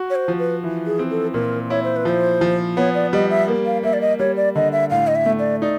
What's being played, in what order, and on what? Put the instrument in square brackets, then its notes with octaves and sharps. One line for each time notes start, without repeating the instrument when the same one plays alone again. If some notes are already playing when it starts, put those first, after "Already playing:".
Already playing: [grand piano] F#4
[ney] C#5
C5
[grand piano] F3
[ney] B4
[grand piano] E3
[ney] G#4
[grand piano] C4
[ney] A4
[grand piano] A#2 [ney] A#4
[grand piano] E4 [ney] C#5
[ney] C5
B4
[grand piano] F3 [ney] C5
[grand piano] F3
[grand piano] B3 [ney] C#5
[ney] D5
[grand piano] G3 [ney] D#5
[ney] E5
[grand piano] A#3
[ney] F5
[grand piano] A#3 [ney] E5
[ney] D5
D#5
[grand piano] G3 [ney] C#5
[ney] D5
[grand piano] D3 [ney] D#5
[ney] E5
[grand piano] A2 [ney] F5
[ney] D#5
E5
[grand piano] A3
[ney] D5
[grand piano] D#4 [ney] D5